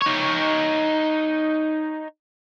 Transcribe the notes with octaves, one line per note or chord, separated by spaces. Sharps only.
D#4 C#5